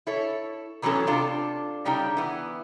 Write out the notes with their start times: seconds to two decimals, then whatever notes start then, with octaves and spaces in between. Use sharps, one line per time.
0.07 E4 A4 C#5
0.82 D#3 E3 F#3 B3 C#4 A4
1.07 C3 D4 F4 A4
1.85 C#3 G3 D4 D#4 G5
2.17 E3 B3